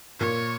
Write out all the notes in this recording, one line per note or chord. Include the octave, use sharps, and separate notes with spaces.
A#2 C#5